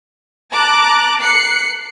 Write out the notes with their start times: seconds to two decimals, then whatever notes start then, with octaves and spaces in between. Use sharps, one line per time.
0.51 A5 A#5 D6 F#6
1.21 F#6 C7 C#7